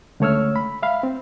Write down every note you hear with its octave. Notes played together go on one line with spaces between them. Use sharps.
C#2 D3 A3 C#5 E6 F6
B5
E5 F5 B5
C4